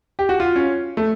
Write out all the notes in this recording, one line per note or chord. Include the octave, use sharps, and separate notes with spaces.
G4
F#4
F4
C#4
A3